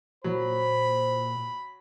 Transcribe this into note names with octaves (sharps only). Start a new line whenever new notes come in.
A#2 F#3 C5 B5